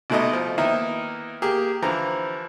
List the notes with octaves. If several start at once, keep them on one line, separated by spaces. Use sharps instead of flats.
C2 B2 A3 D#4 D#5
F3
D#3 A#3 B3 D#4 E4
A#3 G4 G#4
D3 E3 F3 A#5